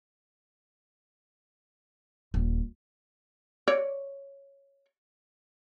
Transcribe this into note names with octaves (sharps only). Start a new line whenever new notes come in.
D#1
C#5 D5